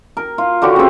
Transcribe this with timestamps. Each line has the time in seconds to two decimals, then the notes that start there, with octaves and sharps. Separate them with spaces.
0.17 A#4
0.38 F4
0.62 D3 F#4 G4 C#5
0.76 C#3 C4